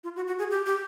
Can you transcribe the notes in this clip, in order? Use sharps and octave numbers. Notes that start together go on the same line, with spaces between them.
F4
F#4
F#4
G#4
G4
G4